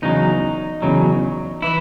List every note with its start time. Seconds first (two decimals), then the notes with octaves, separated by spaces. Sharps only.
0.02 E2 C#3 F#3 D#4
0.82 E2 C#3 F#3
1.62 E3 E4